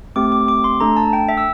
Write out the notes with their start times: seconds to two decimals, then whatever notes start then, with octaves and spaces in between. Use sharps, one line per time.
0.16 A3 C4 G4 D6
0.32 D6
0.48 D6
0.64 C6
0.80 A3 D4 A4 A#5
0.97 A5
1.13 G5
1.29 E5
1.37 E6